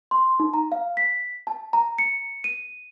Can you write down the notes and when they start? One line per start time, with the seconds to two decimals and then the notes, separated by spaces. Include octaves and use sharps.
0.11 C6
0.40 D#4
0.54 A#5
0.72 F5
0.97 B6
1.47 A5
1.73 A#5
1.98 C#7
2.44 D#7